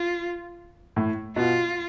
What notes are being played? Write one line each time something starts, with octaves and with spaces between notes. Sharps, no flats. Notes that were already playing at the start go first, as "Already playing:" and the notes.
Already playing: F4
A2
B2 F4